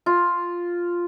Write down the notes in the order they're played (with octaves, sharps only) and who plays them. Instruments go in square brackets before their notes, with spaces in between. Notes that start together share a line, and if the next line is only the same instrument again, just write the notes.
[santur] F4